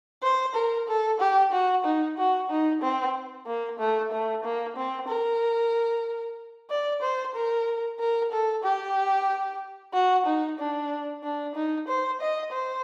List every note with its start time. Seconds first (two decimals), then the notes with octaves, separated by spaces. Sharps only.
0.23 C5
0.55 A#4
0.88 A4
1.20 G4
1.52 F#4
1.84 D#4
2.17 F#4
2.49 D#4
2.82 C4
3.46 A#3
3.79 A3
4.11 A3
4.44 A#3
4.76 C4
5.08 A#4
6.70 D5
7.02 C5
7.35 A#4
8.00 A#4
8.32 A4
8.64 G4
9.94 F#4
10.26 D#4
10.59 D4
11.23 D4
11.55 D#4
11.88 C5
12.21 D#5
12.52 C5